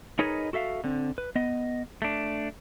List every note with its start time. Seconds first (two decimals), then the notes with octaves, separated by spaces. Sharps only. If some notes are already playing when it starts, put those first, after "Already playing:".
0.19 D#4 G#4 A#4 B4 C#5 D#5
0.53 F#4 A4 E5 F5
0.84 D3 C4
1.18 B4
1.35 B3 D#5
2.02 A3 D4